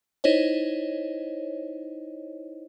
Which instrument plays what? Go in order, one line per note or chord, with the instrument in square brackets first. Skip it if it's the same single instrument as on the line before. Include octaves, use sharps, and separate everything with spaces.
[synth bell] D#4 E4 C5 C#5 D#5